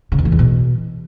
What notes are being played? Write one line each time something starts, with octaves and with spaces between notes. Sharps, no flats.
C#3
E2
E3
E2
B2